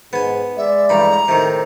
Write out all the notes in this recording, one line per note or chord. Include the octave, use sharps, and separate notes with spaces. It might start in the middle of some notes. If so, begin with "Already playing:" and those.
G#2 B3 G#5
G#3 D5 E5
A1 G2 A#5 B5
A2 C3 D#3